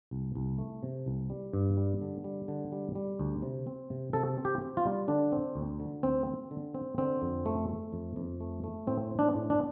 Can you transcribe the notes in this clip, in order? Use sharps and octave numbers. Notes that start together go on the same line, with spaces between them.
C2
C2
A3
C3
C2
G3
G2
G3
D3
G3
D3
G3
G3
D2
C3
C4
C3
C3 A4
C4
G4
C4
F4
G3
D3 D4
C4
D2
D3
D2 C4
C4
D3
C4
D3 C4
F2
A3
A3
F2
F2
A3
A3
A2 C4
C4
D4
A2
D4